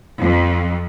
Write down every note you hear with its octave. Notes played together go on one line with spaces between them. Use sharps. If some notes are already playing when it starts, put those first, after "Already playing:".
F2